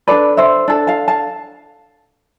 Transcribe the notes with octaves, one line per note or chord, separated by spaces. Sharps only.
D4 A4 B4 D5
C5 E5
D4 A4
F5 A5
F5 A5